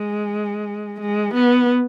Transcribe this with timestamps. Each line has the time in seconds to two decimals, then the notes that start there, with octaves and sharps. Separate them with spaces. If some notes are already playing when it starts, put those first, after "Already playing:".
Already playing: G#3
1.01 G#3
1.34 B3